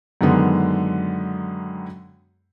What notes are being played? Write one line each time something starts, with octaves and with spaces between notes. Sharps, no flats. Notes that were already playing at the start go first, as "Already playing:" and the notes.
F#2 D3 D#3 G#3 B3